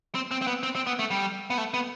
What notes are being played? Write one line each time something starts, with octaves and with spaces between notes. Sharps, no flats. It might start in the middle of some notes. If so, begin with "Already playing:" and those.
C4
C4
C4
B3
C4
C4
B3
A3
G3
B3
A3
B3